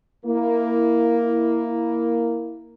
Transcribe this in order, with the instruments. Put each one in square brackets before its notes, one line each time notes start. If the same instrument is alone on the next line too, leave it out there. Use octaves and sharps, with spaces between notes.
[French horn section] A#3 E4